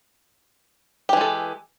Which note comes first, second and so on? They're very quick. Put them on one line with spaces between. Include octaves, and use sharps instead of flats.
G4 E3 G#3 A4